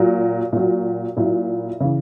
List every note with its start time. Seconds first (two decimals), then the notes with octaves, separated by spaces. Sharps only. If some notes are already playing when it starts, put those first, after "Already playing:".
Already playing: A#2 F#3
0.53 A#2 F#3
1.17 A#2 F#3 E4
1.80 C#3 E3